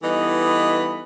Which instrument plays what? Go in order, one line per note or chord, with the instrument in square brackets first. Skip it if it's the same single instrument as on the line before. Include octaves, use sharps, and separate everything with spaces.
[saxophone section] E3 G3 B3 D#4 A4 D#5